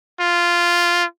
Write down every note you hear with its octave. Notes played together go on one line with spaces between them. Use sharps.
F4